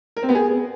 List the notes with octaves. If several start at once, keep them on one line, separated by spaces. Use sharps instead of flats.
A#4
C4
B3
G#4